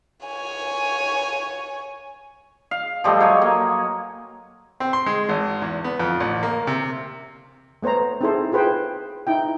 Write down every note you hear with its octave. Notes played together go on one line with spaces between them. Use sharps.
C#5 G#5
F5
F3 G3 A3 D#5
F#3 C#5 G#5
A#3
C4
C6
G#3
G#1
E2
B3
F2
A1
A#3
C3
A3 B3 C5 C#5 A#5
C4 D#4 E4 G#4 A4 C5
F4 G#4 B4 C5 G5
D#4 E4 G5